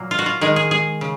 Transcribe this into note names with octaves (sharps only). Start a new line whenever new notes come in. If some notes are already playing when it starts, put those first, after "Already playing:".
Already playing: A#2 F#3 A#3
F4
F#4
F4
D#3 G#3 G#4
G#4
G#4
C#3